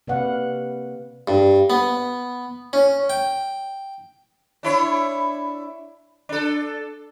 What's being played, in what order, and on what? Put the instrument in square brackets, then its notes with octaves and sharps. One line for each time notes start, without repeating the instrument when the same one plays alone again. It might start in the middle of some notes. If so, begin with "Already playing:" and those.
[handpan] C3 A#3 B4 D5 F5 F#5
[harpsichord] G2
B3
C#4
G5
[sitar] D4 E4 C#5
D4 A4